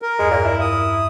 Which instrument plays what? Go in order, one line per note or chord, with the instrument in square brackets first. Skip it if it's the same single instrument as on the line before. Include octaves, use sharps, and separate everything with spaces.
[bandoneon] A#4
[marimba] E2 G2 [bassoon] G#3
[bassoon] A#2
E4
[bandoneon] D#6